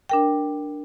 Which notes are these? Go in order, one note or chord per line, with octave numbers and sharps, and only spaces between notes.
D4 A#4 G5